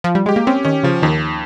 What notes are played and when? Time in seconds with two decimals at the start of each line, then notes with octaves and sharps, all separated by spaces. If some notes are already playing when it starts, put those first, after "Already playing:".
0.04 F3
0.15 G3
0.26 G#3 G4
0.36 A#3
0.47 C4 C#4
0.65 D#3 C#4
0.83 C#3 F3
1.02 D#2 D#3